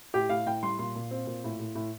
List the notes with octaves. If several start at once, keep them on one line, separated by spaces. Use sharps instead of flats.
A2 G4
A2 F5
A2 G5
G3 C6
A#2 C6
A#2
C4
A#2
A2
A2
A2